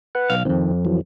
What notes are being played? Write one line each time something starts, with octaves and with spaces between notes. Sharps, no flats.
B4 F#5
B1 F5
B1 F2 D#3 C4
E3 F#3